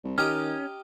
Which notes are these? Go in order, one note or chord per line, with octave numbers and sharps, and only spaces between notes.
C2
D#3 C#4 G4 D#5 A#5 F6